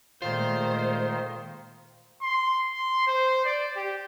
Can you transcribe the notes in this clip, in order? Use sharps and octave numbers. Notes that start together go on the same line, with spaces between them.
A#2 D#3 G#3 A3 F4 C5
C6
C6
C5
D5
G4